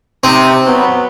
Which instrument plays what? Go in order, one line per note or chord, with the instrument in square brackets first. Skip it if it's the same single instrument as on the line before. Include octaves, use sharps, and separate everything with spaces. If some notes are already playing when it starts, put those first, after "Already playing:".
[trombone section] C3 [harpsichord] C4 [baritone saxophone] D#4
[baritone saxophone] F#3 [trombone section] B3